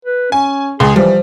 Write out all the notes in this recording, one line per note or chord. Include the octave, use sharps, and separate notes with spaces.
B4
C#4 G#5
C#2 G#4 C6
E3 F3 G3